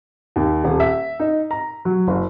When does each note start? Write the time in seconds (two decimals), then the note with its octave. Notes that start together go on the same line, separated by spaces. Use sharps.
0.36 D#2
0.64 D#1
0.80 E5
1.20 D#4
1.51 A#5
1.85 F#3
2.07 F#1